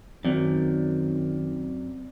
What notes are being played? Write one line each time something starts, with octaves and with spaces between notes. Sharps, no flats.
F#2 D#3 C4 D5